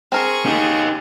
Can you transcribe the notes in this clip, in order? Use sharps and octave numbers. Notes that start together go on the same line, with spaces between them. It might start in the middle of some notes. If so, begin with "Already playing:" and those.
C4 G#4 A#4 C5 C#6
D#4 G4